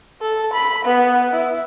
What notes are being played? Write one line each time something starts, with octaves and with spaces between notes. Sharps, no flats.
A4
B5
B3
E4